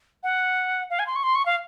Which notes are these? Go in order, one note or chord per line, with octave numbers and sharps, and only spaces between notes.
F#5
F5
G#5
C6
C#6
C6
C#6
F5